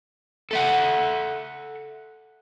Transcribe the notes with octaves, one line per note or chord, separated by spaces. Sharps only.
A4 E5 F#5